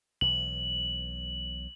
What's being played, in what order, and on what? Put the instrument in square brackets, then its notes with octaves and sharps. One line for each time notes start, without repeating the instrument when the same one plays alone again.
[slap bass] B1 E3 [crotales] F#7